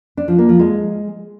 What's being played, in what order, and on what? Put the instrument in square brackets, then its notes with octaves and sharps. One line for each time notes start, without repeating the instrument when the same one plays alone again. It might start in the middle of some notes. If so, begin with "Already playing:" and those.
[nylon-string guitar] D4
F3
A#3
F3
G#3